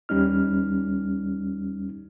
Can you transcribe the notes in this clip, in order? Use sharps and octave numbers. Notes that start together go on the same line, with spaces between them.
D#2 G3 C#4 D#4 F6